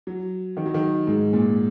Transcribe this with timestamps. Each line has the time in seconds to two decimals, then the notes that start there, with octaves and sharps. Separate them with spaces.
0.07 F#3
0.57 D#3
0.66 F#3
0.74 D#3
1.07 G#2
1.33 A#2